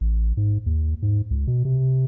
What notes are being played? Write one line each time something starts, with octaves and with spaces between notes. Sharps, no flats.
A1
G#2
D#2
G#2
C#2
B2
C3